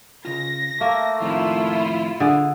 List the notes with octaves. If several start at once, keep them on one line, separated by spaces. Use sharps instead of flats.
C#3 F4 A#6
A3 A#3 E5
F2 A2 D#3 E4 F4
D3 G#4